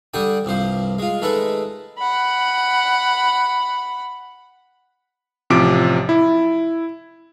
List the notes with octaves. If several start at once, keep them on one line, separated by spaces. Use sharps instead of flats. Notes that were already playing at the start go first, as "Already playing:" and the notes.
D3 G3 D4 D5 G5 D#6
C2 G2 F3 C5
G#3 F4
D#3 G#3 A3 A4 B4
F#5 B5
A1 C3 F3 D6 D7
E4